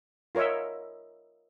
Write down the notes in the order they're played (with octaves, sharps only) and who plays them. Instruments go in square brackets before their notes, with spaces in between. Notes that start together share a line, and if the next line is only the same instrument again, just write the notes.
[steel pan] F4 A#4 C#5 D#5 E5